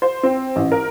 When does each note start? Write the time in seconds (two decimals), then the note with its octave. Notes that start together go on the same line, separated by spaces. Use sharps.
0.02 C5
0.23 C4
0.56 A1
0.72 A#4